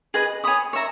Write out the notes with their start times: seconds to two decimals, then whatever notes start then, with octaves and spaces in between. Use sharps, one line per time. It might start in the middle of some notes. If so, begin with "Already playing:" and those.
0.14 G#4 B4 D#5
0.44 C#5 G#5 B5 D#6
0.73 C#5 E5 A#5